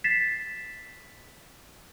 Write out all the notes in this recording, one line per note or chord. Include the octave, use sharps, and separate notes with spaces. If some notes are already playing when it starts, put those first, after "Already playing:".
A6 B6 C7 E7